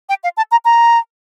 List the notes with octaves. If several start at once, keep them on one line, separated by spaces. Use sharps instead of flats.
G5
F5
A5
A#5
A#5